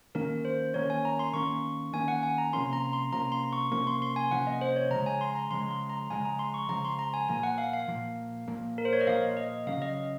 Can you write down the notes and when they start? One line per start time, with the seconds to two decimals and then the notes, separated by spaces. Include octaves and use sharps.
0.15 D#3 A#3 C#4 A#4
0.45 C5
0.74 D#3 A#3 C#4 C#5
0.90 G#5
1.05 A#5
1.19 C6
1.34 D#3 A#3 C#4 C#6
1.93 D#3 A#3 C#4 G#5
2.08 F#5
2.23 G#5
2.38 A#5
2.53 C3 F3 A#3 C#4 C6
2.73 A#5
2.93 C6
3.12 C3 F3 A#3 C#4 A#5
3.32 C6
3.53 C#6
3.72 C3 F3 A#3 C#4 C#6
3.87 C6
4.02 C6
4.16 G#5
4.31 C3 F3 A#3 C#4 F#5
4.47 D#5
4.61 C5
4.76 C#5
4.91 C#3 F3 G#3 A#5
5.06 G#5
5.21 C6
5.35 A#5
5.50 C#3 F3 G#3 C6
5.71 C6
5.89 A#5
6.10 C#3 F3 G#3 G#5
6.25 A#5
6.39 C6
6.54 C#6
6.69 C#3 F3 G#3 A#5
6.85 C6
6.99 A#5
7.14 G#5
7.29 A#2 F3 A#3 G#5
7.43 F#5
7.58 F5
7.73 F5
7.88 A#2 F3 A#3
8.48 A#2 F3 A#3
8.78 A#4
8.85 C5
8.93 C#5
9.01 D#5
9.07 A#2 F3 A#3 F5
9.37 D#5
9.67 C#3 F#3 C#4 F5
9.82 D#5